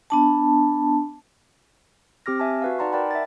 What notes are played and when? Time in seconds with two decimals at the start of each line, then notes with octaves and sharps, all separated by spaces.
0.10 B3 D4 A5
2.26 C4 G4 D6 F6 A#6
2.39 E5 G#5 A5
2.62 F#4 B4 F5
2.79 D#4 D5 F#5 A5 A#5 C6
2.93 A#4 D5 F#5 G5 B5
3.11 E5 A5 A6